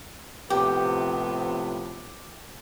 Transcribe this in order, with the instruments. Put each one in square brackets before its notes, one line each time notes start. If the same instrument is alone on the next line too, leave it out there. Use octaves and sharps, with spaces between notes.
[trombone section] A2 C3 F3 [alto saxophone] B3 [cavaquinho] G4